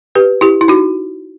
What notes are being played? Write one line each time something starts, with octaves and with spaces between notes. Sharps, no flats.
G4 B4
E4 G4
E4
D#4 F#4